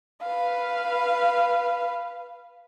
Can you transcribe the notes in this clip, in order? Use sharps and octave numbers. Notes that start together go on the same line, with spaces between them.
B4 F5